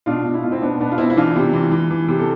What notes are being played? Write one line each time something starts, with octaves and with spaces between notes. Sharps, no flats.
B2 D4 F4
B2
E4
B2 F4
C4 E4
B2 B3 D4
B2 B3 D4
F4
B2 C4 E4
E4
E3 D4 F4
C3
E3
E3
E3
C3
A4